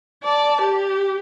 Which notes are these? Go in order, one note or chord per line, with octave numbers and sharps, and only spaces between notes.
D5 A5
G4